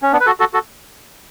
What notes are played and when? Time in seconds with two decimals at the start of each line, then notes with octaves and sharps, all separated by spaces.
0.02 C#4
0.12 B3 D4
0.20 B4
0.26 F#4 A4
0.40 F#4 A4
0.54 F#4 A4